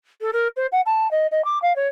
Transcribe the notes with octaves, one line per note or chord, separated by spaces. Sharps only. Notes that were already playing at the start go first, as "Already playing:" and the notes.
A4
A#4
C5
F#5
A5
D#5
D#5
D6
F5
C#5